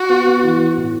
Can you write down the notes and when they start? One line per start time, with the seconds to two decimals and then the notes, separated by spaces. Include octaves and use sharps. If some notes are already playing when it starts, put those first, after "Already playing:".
Already playing: F#4
0.09 B3
0.26 B3
0.43 E3
0.59 B3
0.77 A2